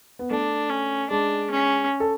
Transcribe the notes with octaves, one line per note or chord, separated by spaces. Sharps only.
B3
A3 D4
C#4
G#3 D4
C#4
A4